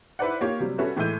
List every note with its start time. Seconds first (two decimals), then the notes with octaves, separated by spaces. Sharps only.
0.19 E4 B4 C5 D5 F#5
0.41 A#3 F4 G4 C#5
0.60 C3 F#3 G3
0.78 G3 C#4 F#4 A4 B4 E5
0.96 A2 E3 G#3 E4 G6 D#7